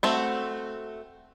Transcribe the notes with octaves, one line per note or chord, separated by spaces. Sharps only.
A3 C4 F#4